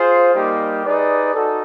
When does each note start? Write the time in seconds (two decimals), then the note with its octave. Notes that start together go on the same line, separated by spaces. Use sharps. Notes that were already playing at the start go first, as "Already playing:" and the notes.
Already playing: F4 G#4 C5 F5
0.34 G3 A#3 D#4 G4
0.85 D#4 G#4 B4 D5
1.34 D#4 F#4 A4